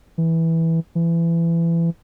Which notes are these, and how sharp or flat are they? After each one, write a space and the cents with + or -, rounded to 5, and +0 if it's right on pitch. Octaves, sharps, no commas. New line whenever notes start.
E3 -10
E3 +25